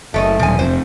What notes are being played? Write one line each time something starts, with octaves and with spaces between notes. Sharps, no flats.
F#1 A3 C#5 D#5
D#1 B1 F3 G#5
F1 F2 C5